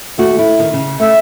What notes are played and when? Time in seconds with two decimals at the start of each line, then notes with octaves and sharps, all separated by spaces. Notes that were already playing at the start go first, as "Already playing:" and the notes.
0.18 D#2 A3 F#4
0.39 E4
0.59 D#3
0.73 C#3
1.00 A3 E5